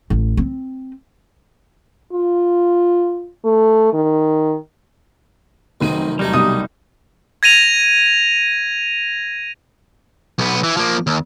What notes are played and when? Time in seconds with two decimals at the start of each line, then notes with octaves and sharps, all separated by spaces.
0.10 A1
0.37 C4
2.13 F4
3.45 A3
3.93 D#3
5.81 F1 F#2 D#3 C4 D#4 D#7
6.19 D#2 F#3 G3 A3 D#4
6.33 C2 B2 D#6 D#7
7.43 G#6 A#6 D#7 F7
10.39 B1 B3
10.64 E3
10.77 F3 A#3
11.07 D#2